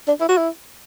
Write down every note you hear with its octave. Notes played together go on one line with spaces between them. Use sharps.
D4
E4
F#4
E4